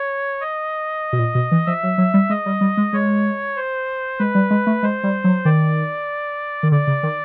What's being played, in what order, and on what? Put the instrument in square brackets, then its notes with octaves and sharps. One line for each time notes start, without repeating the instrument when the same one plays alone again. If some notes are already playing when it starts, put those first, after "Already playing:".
Already playing: [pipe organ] C#5
D#5
[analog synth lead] B2
A#2
B2
E3
[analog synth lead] F3 [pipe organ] E5
[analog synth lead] F#3
F#3
G3
[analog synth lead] G#3 [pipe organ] D#5
[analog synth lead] G3
G3
G#3
[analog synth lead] G#3 [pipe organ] C#5
[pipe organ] C5
[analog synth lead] G#3 [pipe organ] B4
[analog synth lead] G3
G#3
A3
[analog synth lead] G#3 [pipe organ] C5
[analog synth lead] G3
F#3
[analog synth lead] D#3 [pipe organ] D5
[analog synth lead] D#3
[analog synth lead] D3 [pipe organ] D5
[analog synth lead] C#3
D#3